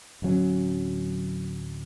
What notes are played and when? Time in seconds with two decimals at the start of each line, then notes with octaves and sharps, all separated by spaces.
0.22 D1 G2 F#3 C#4